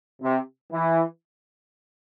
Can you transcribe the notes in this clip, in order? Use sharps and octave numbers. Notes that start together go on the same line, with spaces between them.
C3
E3